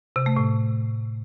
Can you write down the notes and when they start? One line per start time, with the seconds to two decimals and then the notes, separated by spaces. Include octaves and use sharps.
0.16 C3
0.26 A3
0.37 A2